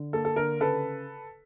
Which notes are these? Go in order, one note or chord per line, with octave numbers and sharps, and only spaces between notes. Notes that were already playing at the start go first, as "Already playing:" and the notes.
Already playing: D3
A#3 A4
A4
D3 A#4
C#3 A4 B4